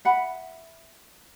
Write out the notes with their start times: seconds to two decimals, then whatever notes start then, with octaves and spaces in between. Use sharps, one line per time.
0.05 E5 F#5 B5